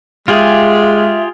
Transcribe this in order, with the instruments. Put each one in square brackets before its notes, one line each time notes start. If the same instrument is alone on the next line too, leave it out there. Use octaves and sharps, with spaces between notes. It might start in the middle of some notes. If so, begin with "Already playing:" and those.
[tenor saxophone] G#3 [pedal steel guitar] F4 G4 G#4 [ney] E5